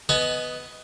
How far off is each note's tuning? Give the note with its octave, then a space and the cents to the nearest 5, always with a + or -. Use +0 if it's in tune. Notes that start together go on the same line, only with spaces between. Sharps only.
B3 +5 D#5 +10 G#5 +35